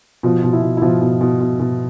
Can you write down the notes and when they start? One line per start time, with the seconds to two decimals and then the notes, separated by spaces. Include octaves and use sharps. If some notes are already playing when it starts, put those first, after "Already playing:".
0.23 B2 F3 F4
0.44 B2
0.53 E4
0.62 B2
0.77 E4
0.82 B2 F3 F4
1.02 B2
1.21 B2
1.40 B2
1.60 B2